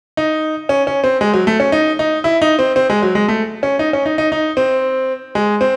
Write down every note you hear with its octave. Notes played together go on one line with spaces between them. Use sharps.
D#4
C#4
C#4
C4
G#3
F#3
A3
C#4
D#4
D#4
E4
D#4
C4
C4
G#3
F#3
G#3
A3
C#4
D#4
C#4
D#4
D#4
D#4
C4
G#3
C4